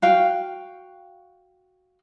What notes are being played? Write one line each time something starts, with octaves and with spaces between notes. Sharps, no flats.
F#4 F5 G5